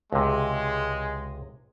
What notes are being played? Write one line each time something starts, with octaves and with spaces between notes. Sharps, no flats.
C#2 C3 G#3